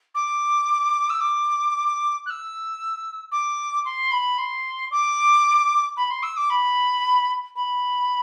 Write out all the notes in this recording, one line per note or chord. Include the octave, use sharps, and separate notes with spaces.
D6
E6
D6
F#6
E6
D6
C6
B5
C6
D6
B5
C6
E6
D6
B5
B5